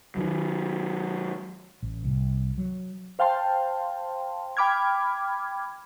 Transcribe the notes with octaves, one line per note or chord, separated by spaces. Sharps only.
D#3 F#3
A1
C2
F#3
C5 F5 G5 A5 C6
G5 B5 D6 F6 G#6